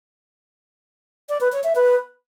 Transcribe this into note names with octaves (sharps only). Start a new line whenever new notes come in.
D5
B4
C#5
E5
B4